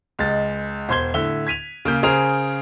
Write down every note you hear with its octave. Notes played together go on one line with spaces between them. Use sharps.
C#2 G#3 A6
E1 C5 C6 G#6 G7
A2 D3 E5 G7
G#6 B6 D#7 F7
C#3 A#3 G6
C#3 G#4 A#4 C5 F7